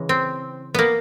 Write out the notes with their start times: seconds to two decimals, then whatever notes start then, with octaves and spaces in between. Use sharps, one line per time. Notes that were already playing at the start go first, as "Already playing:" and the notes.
Already playing: C#3 E3 G#3
0.09 C4
0.74 A#3 B3